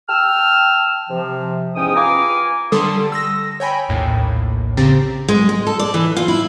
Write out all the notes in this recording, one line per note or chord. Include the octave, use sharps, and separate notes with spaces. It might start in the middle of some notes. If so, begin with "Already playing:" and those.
G5 A5 E6 F6
C3 F3
E2 G#2 C#4 G5 D#6
F4 B4 F5 G#5 A#5 D6
D3 G3 A4 A5 C6 D#6
E6 A#6
C#5 G5 G#5 B5
A#1 D#2 A2
C#3 C4 G4 A#5 A6
G#3
G#3
A4
D5
E3
F4
E4